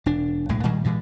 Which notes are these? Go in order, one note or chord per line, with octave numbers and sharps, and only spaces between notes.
E1 D4
B1 A2 G#3
A#2 D#3 G3 G#3
G2 A#2 E3 G#3